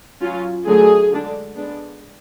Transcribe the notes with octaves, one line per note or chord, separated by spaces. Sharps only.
F#3 C#4 F4
D3 F#3 A3 G#4
D3 G#3 D4
G#3 B3 D4